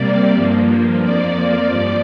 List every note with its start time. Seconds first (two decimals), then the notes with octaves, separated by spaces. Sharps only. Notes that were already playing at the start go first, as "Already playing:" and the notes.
Already playing: C3 G3 A#3 D5
0.33 G2 F3 A#3
1.01 F2 F3 A#3 D5
1.71 G2 F3